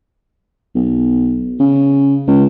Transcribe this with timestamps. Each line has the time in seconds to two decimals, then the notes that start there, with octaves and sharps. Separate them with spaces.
0.75 B1
1.59 C#3
2.27 C#2